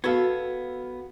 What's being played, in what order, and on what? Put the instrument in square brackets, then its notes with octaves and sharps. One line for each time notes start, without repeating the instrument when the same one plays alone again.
[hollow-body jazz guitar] B3 A4 [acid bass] F#4 [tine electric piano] F5 G#6